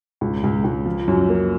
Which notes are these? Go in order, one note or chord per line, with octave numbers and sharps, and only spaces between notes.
C#2
C#2
C#2
F3
F#2
A#3